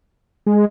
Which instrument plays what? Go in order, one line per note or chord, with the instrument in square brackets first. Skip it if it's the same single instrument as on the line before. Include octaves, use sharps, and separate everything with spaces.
[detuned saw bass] G#3